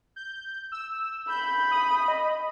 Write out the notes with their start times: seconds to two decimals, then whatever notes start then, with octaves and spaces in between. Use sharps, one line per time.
0.16 G6
0.72 E6
1.29 B5 G6
1.72 D#6
2.08 D#5